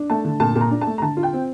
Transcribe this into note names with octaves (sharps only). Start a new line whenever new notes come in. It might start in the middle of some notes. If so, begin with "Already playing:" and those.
Already playing: D4
A3 A5
D3
A#2 A5
A#2
A#5
D4
A5
A3
A#5
D3 A5
F4
G5
C4